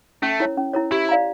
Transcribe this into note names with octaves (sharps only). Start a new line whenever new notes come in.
A3 C#4
E4 A#4 C#5
C#4
E4 A#4 C#5
E4 G4
D5 F5 A#5